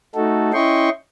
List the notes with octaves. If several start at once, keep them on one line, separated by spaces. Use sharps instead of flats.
A3 D#4 F#4 A4
C#4 E4 D#5 G5 C6 C#6